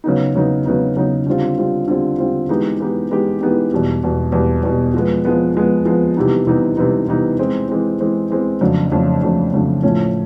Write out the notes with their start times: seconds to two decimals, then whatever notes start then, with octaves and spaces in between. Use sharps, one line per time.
0.04 C#3 F#3 B3 D#4
0.35 C#3 F#3 B3 D#4
0.66 C#3 F#3 B3 D#4
0.96 C#3 F#3 B3 D#4
1.26 D3 G3 C4 F4
1.57 D3 G3 C4 F4
1.88 D3 G3 C4 F4
2.18 D3 G3 C4 F4
2.49 E3 G#3 B3 D#4 G4
2.80 E3 G#3 B3 D#4 G4
3.10 E3 G#3 B3 D#4 G4
3.41 E3 G#3 B3 D#4 G4
3.72 E2 B2 G3
4.02 E2 B2 G3
4.32 E2 B2 G3
4.63 E2 B2 G3
4.94 F3 G#3 B3
5.25 F3 G#3 B3
5.55 F3 G#3 B3
5.85 F3 G#3 B3
6.17 C3 E3 G3 B3 D#4
6.47 C3 E3 G3 B3 D#4
6.77 C3 E3 G3 B3 D#4
7.08 C3 E3 G3 B3 D#4
7.39 E3 G#3 C4
7.69 E3 G#3 C4
8.00 E3 G#3 C4
8.30 E3 G#3 C4
8.61 F2 C#3 F#3 A3 D4
8.92 F2 C#3 F#3 A3 D4
9.22 F2 C#3 F#3 A3 D4
9.53 F2 C#3 F#3 A3 D4
9.83 A2 F3 A3 C#4